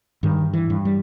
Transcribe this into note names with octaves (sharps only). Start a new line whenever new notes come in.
G2 D#3
E3
G2
G3